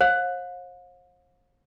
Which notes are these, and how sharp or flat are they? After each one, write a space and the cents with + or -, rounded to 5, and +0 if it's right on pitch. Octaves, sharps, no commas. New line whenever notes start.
C5 +45 F5 +40